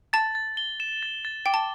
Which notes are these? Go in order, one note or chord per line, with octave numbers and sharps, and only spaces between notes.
A5 A6
A6
G7
E7
A6
A6
G5 D6
A5